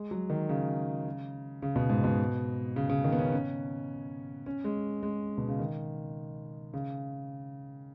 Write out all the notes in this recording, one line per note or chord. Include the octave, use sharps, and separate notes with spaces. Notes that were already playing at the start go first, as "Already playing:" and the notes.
Already playing: G#3
F#3
D#3
C#3
C#3
B2
G#2
B2
C#3
C#3
D#3
B3
C#4
C#4
C#4
G#3
G#3
B2
C#3
D#3
C#3